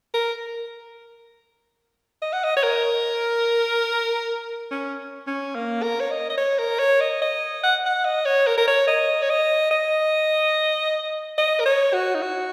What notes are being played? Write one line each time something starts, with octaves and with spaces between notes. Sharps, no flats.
A#4
D#5
F#5
D#5
C#5
A#4
C#4
C#4
A#3
A#4
C#5
D#5
D#5
C#5
A#4
C#5
D#5
D#5
F#5
F#5
D#5
C#5
A#4
A#4
C#5
D#5
C#5
D#5
D#5
D#5
A#4
C#5
F#4
D#4
F#4